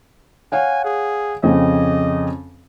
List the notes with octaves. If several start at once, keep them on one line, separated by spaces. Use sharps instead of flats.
C#5 F5 F#5 G#5
G#4
F2 C#3 C4 D#5